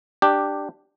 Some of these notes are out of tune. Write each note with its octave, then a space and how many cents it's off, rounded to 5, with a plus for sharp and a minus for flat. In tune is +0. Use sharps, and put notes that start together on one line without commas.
D4 +10 G4 +0